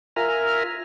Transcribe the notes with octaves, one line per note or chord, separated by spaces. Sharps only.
F4 A#4 E5 G#5 A#5 F6